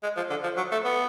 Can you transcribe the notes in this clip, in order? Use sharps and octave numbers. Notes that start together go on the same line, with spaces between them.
G#3
F3
D3
F3
F#3
A3
B3